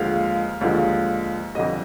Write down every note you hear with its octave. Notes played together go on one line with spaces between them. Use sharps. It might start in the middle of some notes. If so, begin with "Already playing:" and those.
Already playing: D#2 D3 F3 G#3 F5
D#2 D3 F3 G#3
F2 D3 G3 D#5